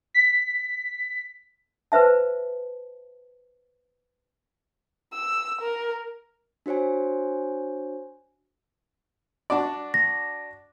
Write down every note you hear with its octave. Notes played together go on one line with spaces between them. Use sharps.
B6
B4 C5 E5 A5
E6
A#4
D4 F#4 C5 C#5 G#5
D4 F#4 D5
A#6